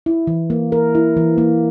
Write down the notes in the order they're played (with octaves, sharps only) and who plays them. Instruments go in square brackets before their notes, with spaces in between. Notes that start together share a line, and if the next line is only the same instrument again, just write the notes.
[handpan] E4
E3
A#3
A#4
E4
E3
A#3